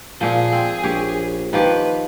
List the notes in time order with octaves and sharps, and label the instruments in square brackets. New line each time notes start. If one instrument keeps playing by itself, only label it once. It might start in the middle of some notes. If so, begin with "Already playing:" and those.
[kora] A#2 F3 [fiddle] G#4
[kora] C4
[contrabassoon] A#1 [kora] G4 C#5
[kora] D#3 F3 G4 [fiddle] B4